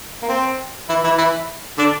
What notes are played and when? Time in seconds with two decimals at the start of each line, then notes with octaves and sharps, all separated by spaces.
0.22 A#3
0.28 C4
0.89 E3 E4
1.04 E3 E4
1.18 E3 E4
1.77 D3 D4